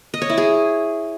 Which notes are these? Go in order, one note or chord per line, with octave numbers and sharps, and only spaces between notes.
D#5
C#5
E4
G#4